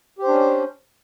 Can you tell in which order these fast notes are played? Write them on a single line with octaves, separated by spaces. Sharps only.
G4 C5 D4 C#4